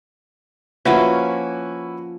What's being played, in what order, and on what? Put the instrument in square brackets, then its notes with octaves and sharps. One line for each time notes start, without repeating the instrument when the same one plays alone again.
[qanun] F3 A#3 C#4 [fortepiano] E4 F#4 B4